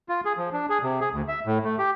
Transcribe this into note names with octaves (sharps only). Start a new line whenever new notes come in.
F4
G#4
F3
D4
G#4
C3
G#4
D2
E5
A2
A3
G4